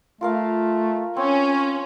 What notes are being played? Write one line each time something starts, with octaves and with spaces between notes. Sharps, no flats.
A3 F4 A#4 F5
C4 C#4 C#5